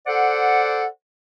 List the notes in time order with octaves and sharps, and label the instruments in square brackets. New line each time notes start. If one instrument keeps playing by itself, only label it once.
[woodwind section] A4 C5 D5 F#5